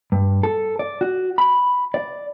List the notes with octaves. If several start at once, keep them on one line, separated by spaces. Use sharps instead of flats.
G2
A4
D5
F#4
B5
D5